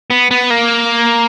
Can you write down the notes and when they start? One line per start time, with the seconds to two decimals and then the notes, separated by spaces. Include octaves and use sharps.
0.10 B3
0.31 B3
0.50 A#3